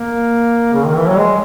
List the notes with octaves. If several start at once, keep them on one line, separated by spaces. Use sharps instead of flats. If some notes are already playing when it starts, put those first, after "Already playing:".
Already playing: A#3
C#3
D#3
E3
F#3
G#3